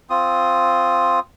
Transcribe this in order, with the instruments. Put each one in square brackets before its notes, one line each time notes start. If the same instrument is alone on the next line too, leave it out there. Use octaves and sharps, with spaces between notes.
[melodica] C4 F4 D#6